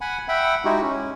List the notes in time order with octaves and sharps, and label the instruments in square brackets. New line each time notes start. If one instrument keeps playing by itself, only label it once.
[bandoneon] F#5 G#5 B5
E5 F#5 G5 B5
G#3 D#4 E4 F#4 G4
C#4